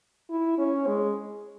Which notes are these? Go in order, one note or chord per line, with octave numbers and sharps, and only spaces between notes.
E4
C#4
G#3